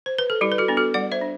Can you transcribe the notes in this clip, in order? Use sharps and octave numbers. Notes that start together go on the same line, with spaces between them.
C5
B4
A4
G3 E4 G4
B4
F#4 A4
B3 D4
F#4 A4
G3 D5 F#5
C5 E5
D4